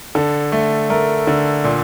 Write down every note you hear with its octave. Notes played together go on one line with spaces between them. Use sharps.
D3 A4
A3
A3 A#4
D3
A#2